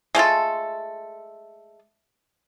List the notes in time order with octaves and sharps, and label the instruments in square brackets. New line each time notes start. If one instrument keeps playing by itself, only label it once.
[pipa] G#3 A3 F4 A4